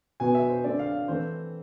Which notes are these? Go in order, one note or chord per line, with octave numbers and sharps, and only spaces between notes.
B2 B3 G#5
E5
C5
D3 A3 C4 D5
F5
E3 A3 C4 C5